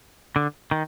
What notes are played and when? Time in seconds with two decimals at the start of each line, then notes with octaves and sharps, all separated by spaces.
0.36 D3
0.71 D#3